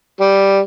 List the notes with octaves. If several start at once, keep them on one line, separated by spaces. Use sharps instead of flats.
G3